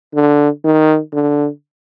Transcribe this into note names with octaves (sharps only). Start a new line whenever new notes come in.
D3
D#3
D3